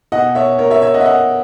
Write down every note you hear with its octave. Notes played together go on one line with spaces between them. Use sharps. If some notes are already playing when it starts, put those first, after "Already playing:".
B2 D#5 F#5
C#5 E5
A#4 C#5
C#5 E5
C#5 E5
D#5 F#5
E5
D#5 F#5